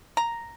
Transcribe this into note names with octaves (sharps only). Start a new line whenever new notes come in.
A#5